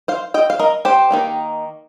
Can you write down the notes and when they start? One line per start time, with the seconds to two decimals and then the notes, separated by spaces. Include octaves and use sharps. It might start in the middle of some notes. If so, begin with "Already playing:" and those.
0.08 C5 F5
0.34 D#5 G5
0.50 F5
0.59 A#4 D#5
0.85 G4 C5
1.10 D#3 A#3 D#4